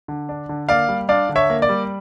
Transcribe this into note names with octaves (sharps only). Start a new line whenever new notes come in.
D3
D4
D3
A#3 D5 F5
G3
D4 D5 F5
D3
C#5 E5
A#3
D5
G3